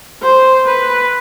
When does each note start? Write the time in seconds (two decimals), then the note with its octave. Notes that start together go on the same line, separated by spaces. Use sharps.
0.22 C5
0.65 B4